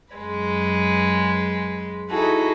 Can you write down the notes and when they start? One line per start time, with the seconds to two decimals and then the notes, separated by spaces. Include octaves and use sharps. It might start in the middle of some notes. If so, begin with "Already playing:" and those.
0.14 F#2 G#3 B4
2.10 D#4 E4 F#4 G#4 A4